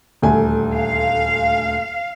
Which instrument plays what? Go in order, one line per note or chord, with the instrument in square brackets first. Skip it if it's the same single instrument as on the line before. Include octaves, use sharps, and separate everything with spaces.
[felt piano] D#1 D2 G#5
[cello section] F5